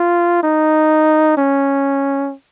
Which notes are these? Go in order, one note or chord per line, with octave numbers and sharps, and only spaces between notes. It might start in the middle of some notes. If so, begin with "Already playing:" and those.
Already playing: F4
D#4
C#4